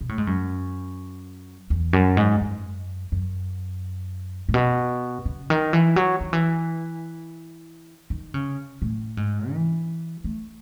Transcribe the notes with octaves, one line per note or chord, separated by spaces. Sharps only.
B2
A2
G#2
F#2
E2
F#2
G#2
F#2
F#2
A2
B2
C#3
D#3
E3
F#3
D#3
E3
D#3
C#3
A2
G#2
E3
A3